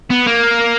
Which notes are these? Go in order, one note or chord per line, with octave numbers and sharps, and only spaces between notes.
B3
A#3